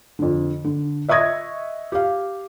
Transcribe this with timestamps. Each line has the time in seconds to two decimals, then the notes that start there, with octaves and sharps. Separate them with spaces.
0.19 F2 D3
0.64 D3
1.09 D#5 E5 C#6 D#6 G#6 A#6
1.92 G4 F5